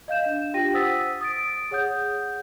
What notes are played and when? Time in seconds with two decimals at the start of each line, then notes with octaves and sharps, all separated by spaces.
0.08 D#5 F5 G6 E7
0.26 D4 E7
0.53 D4 F4 G4 G5 A#6 D#7
0.74 C5 F#5 D#6 E6 A6 B6
1.21 D#6 A6 D7
1.71 G#4 C#5 F#5 D#6 G6